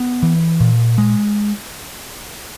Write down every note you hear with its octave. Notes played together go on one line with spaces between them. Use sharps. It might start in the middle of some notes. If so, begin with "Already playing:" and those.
Already playing: B3
E3
A#2
G#3